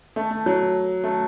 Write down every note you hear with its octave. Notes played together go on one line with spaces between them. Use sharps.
A3
A3
F#3
A3